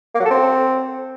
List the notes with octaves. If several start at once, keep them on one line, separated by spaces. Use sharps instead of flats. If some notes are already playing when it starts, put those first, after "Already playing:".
A#3
F#3
A4
C4